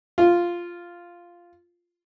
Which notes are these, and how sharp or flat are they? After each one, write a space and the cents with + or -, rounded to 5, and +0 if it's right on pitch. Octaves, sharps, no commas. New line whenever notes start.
F4 -5